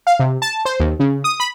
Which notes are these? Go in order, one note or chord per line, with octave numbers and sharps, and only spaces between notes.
F5
C3
A5
C5
D#2
C#3
D#6
B5